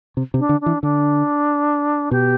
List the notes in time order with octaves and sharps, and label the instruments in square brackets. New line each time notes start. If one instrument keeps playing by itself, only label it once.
[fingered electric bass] C3
C3
[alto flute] D4
[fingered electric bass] D3
[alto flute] D4
[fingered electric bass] E3
[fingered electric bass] D3 [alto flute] D4
[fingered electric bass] B2 [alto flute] G4